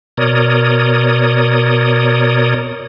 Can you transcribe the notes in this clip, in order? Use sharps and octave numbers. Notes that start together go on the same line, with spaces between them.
B2 A#4 C#5 D5 D#6